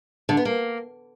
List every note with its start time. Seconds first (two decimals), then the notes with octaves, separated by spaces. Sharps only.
0.29 D3
0.37 B3
0.45 A#3